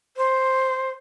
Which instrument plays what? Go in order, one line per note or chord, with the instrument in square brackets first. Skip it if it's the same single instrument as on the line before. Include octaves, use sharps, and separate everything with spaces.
[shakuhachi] C5